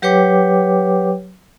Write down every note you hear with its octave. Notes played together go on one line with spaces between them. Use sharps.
F#3 G4 B4 C#5 G5 D6